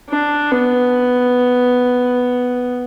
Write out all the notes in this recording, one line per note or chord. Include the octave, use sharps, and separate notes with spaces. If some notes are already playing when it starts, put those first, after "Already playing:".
D4
B3